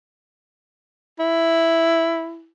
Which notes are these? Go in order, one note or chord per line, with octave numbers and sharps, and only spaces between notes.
E4